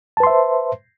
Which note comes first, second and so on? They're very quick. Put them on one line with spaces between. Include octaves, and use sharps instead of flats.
A5 B4 C6 E5 C5